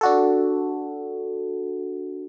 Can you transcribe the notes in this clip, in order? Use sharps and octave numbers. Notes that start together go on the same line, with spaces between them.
D4 F#4 A4